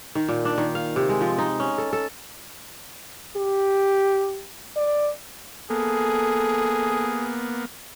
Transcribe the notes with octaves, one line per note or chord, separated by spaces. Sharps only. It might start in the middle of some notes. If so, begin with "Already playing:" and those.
D#3
A#2
D4
D#3
F5
C3
G#3
F3
D#4
C#4
A4
A4
G4
D5
A#3 B3 G#4 A4